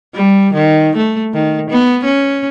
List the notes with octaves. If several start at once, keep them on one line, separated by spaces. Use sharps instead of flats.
G3
D#3
A3
D#3
B3
C#4